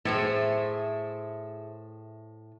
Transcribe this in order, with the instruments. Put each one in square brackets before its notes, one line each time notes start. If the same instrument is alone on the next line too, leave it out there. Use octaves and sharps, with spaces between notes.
[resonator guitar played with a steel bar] A2 [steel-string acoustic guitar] G#4 C5 E5